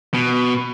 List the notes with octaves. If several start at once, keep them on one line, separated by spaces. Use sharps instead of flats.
B2